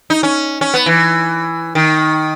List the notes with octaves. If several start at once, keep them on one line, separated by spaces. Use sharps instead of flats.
D#4
C#4
C#4
B3
E3
D#3